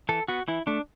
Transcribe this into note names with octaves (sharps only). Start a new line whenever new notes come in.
E3 A4
B3 F#4
E3 E4
A3 D4